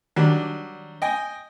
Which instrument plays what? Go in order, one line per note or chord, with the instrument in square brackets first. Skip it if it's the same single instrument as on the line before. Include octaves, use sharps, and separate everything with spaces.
[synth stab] D#3 D4 [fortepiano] F#3 G3
[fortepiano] D#5 G5 G#5